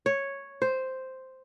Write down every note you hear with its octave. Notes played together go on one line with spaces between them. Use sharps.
C#5
C5